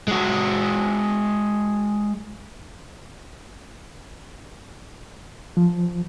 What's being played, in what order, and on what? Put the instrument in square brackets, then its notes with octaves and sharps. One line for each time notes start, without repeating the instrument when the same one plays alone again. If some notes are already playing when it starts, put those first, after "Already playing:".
[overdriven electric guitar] G#3 F#4
[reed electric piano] F3